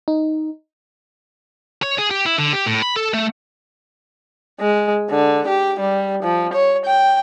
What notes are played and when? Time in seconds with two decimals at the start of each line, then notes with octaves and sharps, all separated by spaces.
0.08 D#4
1.83 C#5
1.98 G#4
2.11 G4
2.26 E4
2.38 D3
2.53 G4
2.66 A2
2.82 B5
2.96 A4
3.14 A3
4.60 G#3
5.09 D3
5.48 G4
5.79 G3
6.22 F3
6.53 C#5
6.85 G5